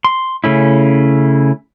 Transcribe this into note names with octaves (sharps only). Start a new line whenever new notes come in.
C6
C#3 A3 C#4 E4